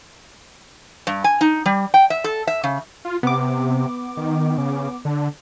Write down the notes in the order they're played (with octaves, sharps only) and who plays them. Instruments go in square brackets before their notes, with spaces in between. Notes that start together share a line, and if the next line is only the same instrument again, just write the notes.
[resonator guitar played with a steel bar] G2
G#5
D#4
G3
G5
E5
A4
E5
C#3
[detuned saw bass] F4
[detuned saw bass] C3 [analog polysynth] B3 D6
[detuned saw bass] D#3
C#3
D3